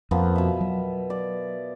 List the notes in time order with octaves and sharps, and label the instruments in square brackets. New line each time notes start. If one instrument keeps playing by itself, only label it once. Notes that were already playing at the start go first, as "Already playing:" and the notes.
[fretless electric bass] F2 [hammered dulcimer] F3 A#3 B3
[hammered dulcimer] B2 E5
[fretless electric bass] F#3
[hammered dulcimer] D5